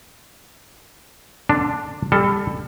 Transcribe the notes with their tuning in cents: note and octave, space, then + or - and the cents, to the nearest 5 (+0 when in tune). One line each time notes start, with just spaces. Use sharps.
D3 +25 D4 +0
G3 +30 A4 +0